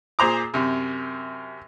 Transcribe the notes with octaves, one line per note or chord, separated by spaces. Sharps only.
A#2 G#4 C5 A#5 D6
F#2 C3